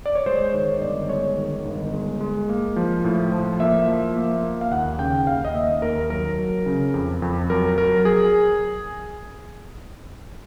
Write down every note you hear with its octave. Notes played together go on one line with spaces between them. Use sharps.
D5
C#5
G#3 C5
D#3 C#5
G1 D5
G#3 C#5
D#3
G1
G#3
G#3
A#3
F3
A2
F3
A#3 E5
F3
A#3
A#3
F5
D#2 F#5
C#3 G5
D#2 F5
D#5
A#3 E5
D#2 A#4
F#3 A#4
F#3
C#3
F2
F2
F#3 A#4
F#3 A#4
G#4